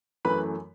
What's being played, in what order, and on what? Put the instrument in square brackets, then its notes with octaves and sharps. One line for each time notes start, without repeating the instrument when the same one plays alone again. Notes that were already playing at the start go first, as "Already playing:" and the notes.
[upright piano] F#2 E3 A3 B4 B5